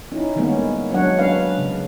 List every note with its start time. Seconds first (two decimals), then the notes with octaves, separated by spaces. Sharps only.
0.12 C#4 D#4 E4
0.36 D#3 G3 G#3 A#3 B3 C#4
0.90 F#3 G#3 C#4 D4 C#5 F#5
1.19 F#3 C#4 D4 B4 F5
1.58 C#3